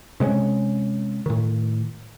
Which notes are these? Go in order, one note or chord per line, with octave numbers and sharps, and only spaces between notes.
C3 G#3 A#3 C#4
A2 D#3